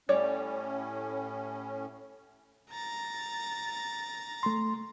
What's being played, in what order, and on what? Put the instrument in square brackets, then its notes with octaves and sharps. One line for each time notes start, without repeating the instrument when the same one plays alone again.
[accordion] A2 C#4 [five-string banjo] G3 C#5 D5
[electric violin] A#5 A6
[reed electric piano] A3 C6